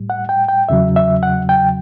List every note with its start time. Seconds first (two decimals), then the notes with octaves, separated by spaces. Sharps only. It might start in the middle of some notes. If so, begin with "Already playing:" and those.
Already playing: A2 G3
0.10 F#5
0.29 G5
0.48 G5
0.69 E2 C#3 F#3 E5
0.96 E5
1.23 F#5
1.49 G5